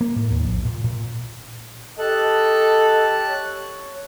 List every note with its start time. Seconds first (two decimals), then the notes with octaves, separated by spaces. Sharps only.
0.01 A#3
0.16 A2
0.30 D#2
0.44 A#1
0.65 A#2
0.84 A#2
1.99 G4 A4 D#5 A5 F#6
3.26 C#5